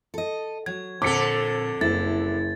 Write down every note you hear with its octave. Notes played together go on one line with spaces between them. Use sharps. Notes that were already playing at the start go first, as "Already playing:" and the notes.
A4 D#5
F#3 G#6
F2 A#2 D3 A4 D6 B6 C#7
F#1 E4 A6